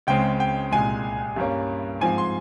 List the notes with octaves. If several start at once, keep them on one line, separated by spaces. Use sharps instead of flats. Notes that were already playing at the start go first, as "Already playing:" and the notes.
C#2 C#3 G#3 C4 G5
G5
C2 A#2 G#3 G#5
G2 G3 A#3 C#4
G#2 F3 C4 G#5
C6